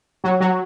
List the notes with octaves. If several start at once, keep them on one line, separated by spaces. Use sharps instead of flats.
F#3 F#4
F#3 F#4